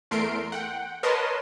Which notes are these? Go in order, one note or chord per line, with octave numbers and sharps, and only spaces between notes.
E2 A3 A#4 C6 C7 D7
F#5 G5
A#4 B4 C#5 D#5 A5 C6